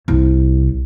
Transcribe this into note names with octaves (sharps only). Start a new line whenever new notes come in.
C2